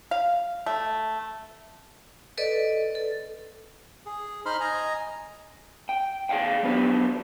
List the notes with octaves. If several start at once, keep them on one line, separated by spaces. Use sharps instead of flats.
F5
A3
A4 B4 D5 D#5
A4
G#4
D#4 C5 B5 C6 F6
D#5 G#5 A#5
G5
G#4 D5 F5 G5
F3 F#3 B3 D4 G4 B4